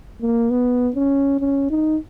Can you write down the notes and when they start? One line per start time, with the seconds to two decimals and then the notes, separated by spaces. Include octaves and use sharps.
0.21 A#3
0.50 B3
0.96 C#4
1.40 C#4
1.70 D#4